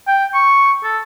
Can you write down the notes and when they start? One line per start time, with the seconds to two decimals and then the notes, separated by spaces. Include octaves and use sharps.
0.07 G5
0.34 C#6
0.84 A4